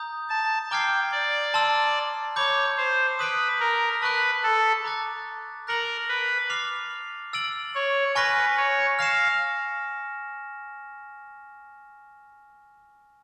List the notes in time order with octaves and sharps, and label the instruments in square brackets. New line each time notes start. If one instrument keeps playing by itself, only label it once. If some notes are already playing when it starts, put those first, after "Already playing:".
Already playing: [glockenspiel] A#5 D#6 G6
[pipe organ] A5
[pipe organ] G5 [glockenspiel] A#5 D6 F6 G#6 C7
[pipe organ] D5
[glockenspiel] A5 C6 E6
[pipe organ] C#5 [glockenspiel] B5 D6 G6
[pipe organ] C5
[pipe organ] B4 [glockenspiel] D#6 G6 B6 D7
[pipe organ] A#4
[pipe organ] B4 [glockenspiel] A5 C#6 F#6
[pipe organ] A4
[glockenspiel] A#5 D6 F#6 A6
[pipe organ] A#4 [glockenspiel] F#6 A#6 C#7 F#7
[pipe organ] B4
[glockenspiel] D6 F6 A6 C7 F7
E6 A6 D7 F#7
[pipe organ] C#5
[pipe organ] B4 [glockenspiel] G#5 C#6 F6 A#6
[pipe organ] C#5
[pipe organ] F5 [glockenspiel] F6 A#6 C#7 E7